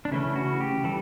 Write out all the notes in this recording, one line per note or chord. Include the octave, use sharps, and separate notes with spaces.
D4
C#3 E3 A3 C#4 E4
F#4
G4
E3 G3 A4